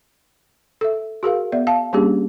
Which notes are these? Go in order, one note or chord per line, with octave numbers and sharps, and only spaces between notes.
A4 E5
F#4 G#4 A#4 F5
B3 D5 E5
F5 A5
G3 A#3 C#4 D4 G4 G#4